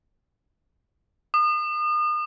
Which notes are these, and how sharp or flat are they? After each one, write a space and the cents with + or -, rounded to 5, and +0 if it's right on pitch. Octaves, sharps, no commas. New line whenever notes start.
D#6 -40